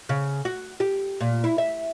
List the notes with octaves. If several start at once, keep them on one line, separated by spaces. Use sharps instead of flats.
C#3
F#4
G4
A#2
E4
E5